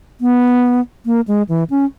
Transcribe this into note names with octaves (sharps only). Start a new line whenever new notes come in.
B3
A#3
G#3
E3
C#4